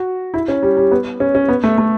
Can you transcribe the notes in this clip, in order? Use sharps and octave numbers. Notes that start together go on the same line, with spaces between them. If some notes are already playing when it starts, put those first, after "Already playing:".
Already playing: F#4
E4
C#4
G3
G3
B3
C#4
C#4
B3
A3
A3